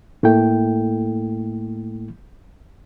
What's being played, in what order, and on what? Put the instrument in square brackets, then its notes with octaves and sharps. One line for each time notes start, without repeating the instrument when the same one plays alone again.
[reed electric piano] A2 A3 A#3 E4 A4 G5